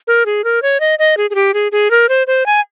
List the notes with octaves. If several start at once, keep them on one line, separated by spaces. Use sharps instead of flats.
A#4
G#4
A#4
C#5
D#5
D#5
G#4
G#4
G4
G#4
G#4
A#4
C5
C5
G#5